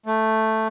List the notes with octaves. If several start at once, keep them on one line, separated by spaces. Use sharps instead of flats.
A3